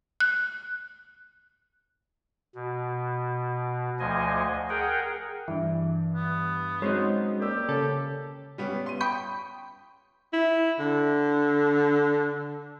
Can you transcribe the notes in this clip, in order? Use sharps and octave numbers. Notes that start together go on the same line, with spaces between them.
F#6
B2
D2 F3 D#5 G#5
G#4 A#4 F#5 G5
G2 E3
B3
F#3 G#3 C4 C#4 D#4
A#3 G4 D5 E6
C#3 A4
G3 B3 C#4
C6 D#7
G5 B5 C#6 D#6 G6
E4
D3